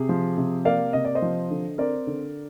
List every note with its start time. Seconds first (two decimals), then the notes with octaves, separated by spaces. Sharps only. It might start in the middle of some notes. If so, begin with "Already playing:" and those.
Already playing: C3 G#4
0.09 F3
0.38 C3
0.65 A#3 D5 F5
0.93 C3 D#5
1.05 D5
1.15 C5 D#5
1.22 F3
1.50 D3
1.78 C4 A#4 D5
2.07 D3